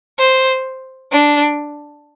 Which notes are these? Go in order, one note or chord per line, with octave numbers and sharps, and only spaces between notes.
C5
D4